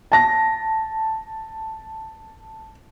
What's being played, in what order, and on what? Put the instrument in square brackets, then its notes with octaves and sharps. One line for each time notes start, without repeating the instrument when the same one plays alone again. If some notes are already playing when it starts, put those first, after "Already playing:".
[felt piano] A5 A#6